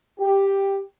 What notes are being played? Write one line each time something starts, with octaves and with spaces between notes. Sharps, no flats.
G4